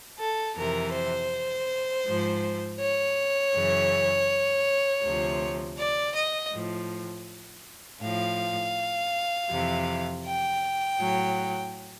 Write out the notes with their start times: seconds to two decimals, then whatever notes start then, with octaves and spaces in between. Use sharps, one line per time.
0.18 A4
0.56 F2 C3 E3 A#4
0.93 C5
2.05 G#2 F3
2.80 C#5
3.54 F#2 C#3 E3
5.03 D2 C3 F3
5.78 D5
6.15 D#5
6.52 A2 F3
8.01 A2 F3 F5
9.50 F2 C3 E3
10.25 G5
10.99 A2 F#3